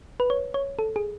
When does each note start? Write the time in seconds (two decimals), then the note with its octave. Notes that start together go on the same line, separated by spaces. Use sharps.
0.20 B4
0.30 C#5
0.54 C#5
0.79 A4
0.96 G#4